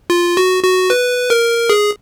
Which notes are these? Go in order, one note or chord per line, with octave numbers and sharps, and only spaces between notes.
F4
F#4
F#4
B4
A#4
G#4